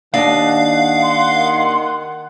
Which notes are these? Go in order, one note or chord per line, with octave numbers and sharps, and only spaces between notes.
D#2 D#3 D4 D#5 F5 F#5
C6